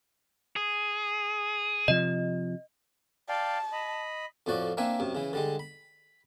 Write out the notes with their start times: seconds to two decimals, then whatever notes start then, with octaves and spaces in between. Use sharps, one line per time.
0.56 G#4
1.88 C3 F3 D#5
3.29 D5 F5 G5 A5
3.72 D#5 B5
4.46 F2 A2 F3 F#4 D5
4.77 A#3 C4 D4 E5 G#5
5.00 F#2 C3
5.15 C#3 E3
5.33 D3 G3 G#3
5.59 B5